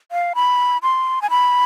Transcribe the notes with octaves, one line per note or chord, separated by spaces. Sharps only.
F5
B5
C6
G#5
B5